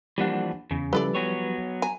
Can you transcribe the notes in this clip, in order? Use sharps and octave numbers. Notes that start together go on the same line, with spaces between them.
E3 F3 G3 A#3 D4 F#5
E2 C#3
F3 G3 E4 A4 B4 D5
F#3 B3 C#5
G#5 A#5